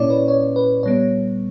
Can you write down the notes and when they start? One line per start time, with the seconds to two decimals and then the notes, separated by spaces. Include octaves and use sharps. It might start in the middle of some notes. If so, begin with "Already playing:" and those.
Already playing: A#2 A#3 C#4 E4 C#5 D5
0.10 B4
0.28 C#5
0.56 B4
0.83 A#2 G3 B3 C#5